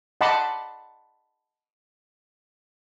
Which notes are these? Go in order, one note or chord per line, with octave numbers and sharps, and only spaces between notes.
D#5 F#5 A5 B5 C6 D6